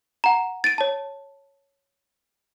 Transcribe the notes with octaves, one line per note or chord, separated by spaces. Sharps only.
F#5 A#5
A6 D7 D#7
C#5 A5